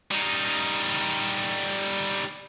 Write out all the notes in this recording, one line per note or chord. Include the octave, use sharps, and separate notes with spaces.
G3 D#4